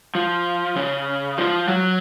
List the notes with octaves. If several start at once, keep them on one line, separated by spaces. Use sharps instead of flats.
F3
C#3
F3
F#3